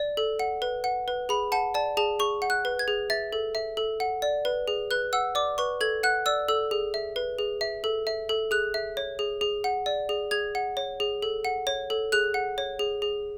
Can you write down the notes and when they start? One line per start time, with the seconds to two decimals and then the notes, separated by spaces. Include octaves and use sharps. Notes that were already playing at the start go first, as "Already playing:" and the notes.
Already playing: D5
0.17 A4
0.39 F#5
0.62 B4
0.84 F#5
1.08 B4
1.29 G#4 B5
1.52 F#5 A5
1.74 D5 A5
1.97 G#4 A5
2.19 G#4 C#6
2.42 F#5
2.50 F#6
2.65 B4
2.79 G#6
2.88 G#4
3.10 E5 A6
3.32 A4
3.55 E5
3.77 A4
4.00 F#5
4.22 D5
4.45 B4
4.68 G#4
4.91 B4 F#6
5.13 F#5 E6
5.35 D5 D6
5.58 B4 C#6
5.81 A4 G#6
6.03 F#5 F#6
6.26 D5 E6
6.48 A4 E6
6.71 G#4
6.94 E5
7.16 B4
7.38 G#4
7.61 E5
7.84 A4
8.07 E5
8.29 A4
8.51 G#4 F#6
8.74 E5
8.97 C#5
9.19 G#4
9.41 G#4
9.64 F#5
9.86 D5
10.09 G#4
10.31 G#4 G#6
10.55 F#5
10.77 C#5
11.00 G#4
11.22 A4
11.45 F#5
11.67 C#5
11.90 A4
12.12 G#4 F#6
12.34 F#5
12.58 C#5
12.79 G#4
13.02 G#4